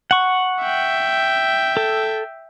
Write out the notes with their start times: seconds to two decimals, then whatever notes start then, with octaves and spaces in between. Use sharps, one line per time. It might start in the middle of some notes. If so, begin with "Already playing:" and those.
0.11 F#5 C#6
0.62 E5 G5
1.77 A4